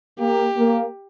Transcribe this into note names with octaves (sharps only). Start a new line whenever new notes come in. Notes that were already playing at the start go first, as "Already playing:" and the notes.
A#3 G4
A#3